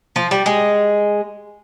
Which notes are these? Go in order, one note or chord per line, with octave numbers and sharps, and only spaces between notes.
F3
G3
G#3